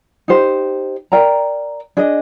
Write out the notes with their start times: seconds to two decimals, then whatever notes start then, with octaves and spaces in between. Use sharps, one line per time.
0.28 D#4 G4 C5
1.12 A#4 D5 G5 A#5
1.97 D4 G#4 D#5